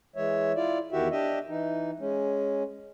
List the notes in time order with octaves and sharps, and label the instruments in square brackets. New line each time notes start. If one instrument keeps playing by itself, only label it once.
[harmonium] E3 G#3 C#5 E5
E4 F4 D5
E2 D#3 E4 F#4 G4 E5
D4 G4 D#5 E5
E3 D#4
G#3 C#4